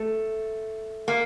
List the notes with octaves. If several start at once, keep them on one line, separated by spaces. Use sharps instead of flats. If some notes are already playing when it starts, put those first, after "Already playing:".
Already playing: A3
A#3